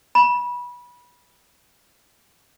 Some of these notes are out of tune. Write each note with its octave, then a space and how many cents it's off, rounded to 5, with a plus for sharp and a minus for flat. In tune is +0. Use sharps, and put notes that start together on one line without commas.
B5 -20